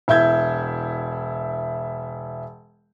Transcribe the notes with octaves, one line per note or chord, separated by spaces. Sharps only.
E1 E4 E5 G6 G#6